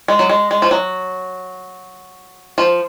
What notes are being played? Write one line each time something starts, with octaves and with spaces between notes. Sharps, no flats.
G#3
F#3
G#3
G#3
F3
F#3
F3